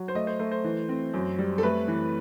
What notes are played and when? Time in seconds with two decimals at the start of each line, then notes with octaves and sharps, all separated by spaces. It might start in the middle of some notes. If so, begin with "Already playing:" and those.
Already playing: F#3
0.08 C5
0.15 A3 D#5
0.27 C5
0.39 A3 C5
0.51 C5
0.64 E3
0.89 C4
1.14 F#2
1.39 G3
1.58 A4
1.63 A3 B4
1.88 E3